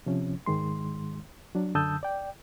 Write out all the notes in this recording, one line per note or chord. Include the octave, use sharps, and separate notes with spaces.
C3 F3 C#4
G#2 D#3 G#3 C6
F#3 D4
F#2 D3 A5 D#6 E6 G6
D5 G5